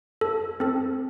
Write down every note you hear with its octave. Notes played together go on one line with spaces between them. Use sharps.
A4
C4 A4